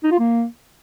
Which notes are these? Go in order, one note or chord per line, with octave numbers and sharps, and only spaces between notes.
D#4
F4
A#3